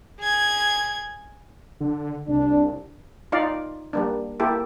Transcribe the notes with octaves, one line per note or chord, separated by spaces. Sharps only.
G#4 G#6
D3
C2 D4
D#4 F4 D5 F5
G3 A#3 D4
A#3 E4 G4 A4